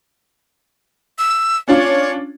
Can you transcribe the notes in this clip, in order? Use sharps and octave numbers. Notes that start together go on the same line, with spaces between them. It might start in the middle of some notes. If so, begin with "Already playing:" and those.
E6
C#4 D4 F4 C#5